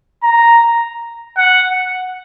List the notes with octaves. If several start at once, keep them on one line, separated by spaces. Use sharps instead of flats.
A#5
F#5